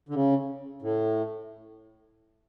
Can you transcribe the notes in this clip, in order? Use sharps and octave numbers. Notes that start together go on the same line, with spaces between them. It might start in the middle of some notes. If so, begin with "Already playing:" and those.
D3
C#3
A2